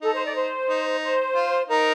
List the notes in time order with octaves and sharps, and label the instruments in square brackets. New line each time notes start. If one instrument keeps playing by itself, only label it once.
[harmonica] D#4 [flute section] A4
[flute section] C5
D5
C5
[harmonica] D#4
[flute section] C5
[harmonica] F4
[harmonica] D#4 [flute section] A#4